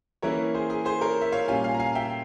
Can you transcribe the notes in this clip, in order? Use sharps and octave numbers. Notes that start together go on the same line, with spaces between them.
E3 A#3 C#4 E4 A#4 C#5
G#4 C5
G#4
G#4 C5
A#4 C#5
E5
C#5 F5
A#2 G3 C#4 F4 F5 G#5
F5 G#5
A#5
F5 G#5
E5 G5